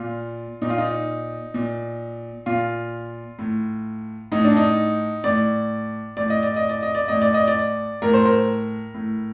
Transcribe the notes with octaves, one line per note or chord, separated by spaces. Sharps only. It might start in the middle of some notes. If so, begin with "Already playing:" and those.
Already playing: A#2 F4
A#2 D#4
F4
D#4
A#2
A#2 F4
A2
A2 D#4
D4
D#4
A2 D5
A2 D5
D#5
D5
D#5
D5
D#5
D5
A2 D#5
D5
D#5
D5
A2 A#4
C5
A#4
A2